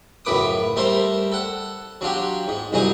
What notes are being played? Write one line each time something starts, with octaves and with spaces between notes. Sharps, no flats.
C#2 F#2 A2 B4 D6 D#6
G3 A3 A4 A#4 C5 C6
A4 F#5
F#3 D4 F4 G4
G#2
C2 G2 F#3 D#4 G#4 G#5